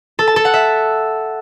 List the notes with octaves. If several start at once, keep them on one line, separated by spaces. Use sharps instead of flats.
A4
A5
A4
F#5
E5